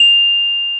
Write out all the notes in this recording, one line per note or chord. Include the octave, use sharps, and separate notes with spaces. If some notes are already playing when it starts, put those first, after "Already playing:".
Already playing: F7